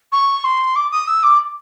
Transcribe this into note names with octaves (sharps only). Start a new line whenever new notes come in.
C#6
C6
D6
D#6
E6
D6